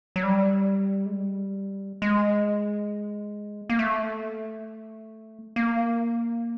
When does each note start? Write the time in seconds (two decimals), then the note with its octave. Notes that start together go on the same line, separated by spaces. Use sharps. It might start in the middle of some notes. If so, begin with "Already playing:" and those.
0.16 F#3
0.23 G3
1.06 G#3
1.13 G3
2.02 G#3
3.70 A#3
3.79 A3
5.56 A#3